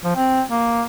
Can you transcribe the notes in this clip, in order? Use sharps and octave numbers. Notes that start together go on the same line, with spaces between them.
F3
C4
A#3